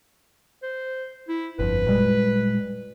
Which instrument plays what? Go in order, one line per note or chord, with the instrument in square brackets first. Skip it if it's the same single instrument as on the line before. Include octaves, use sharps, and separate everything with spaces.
[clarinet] C5
E4
[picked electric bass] G1 F2 [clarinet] B4
[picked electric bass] A#2 G3 G#3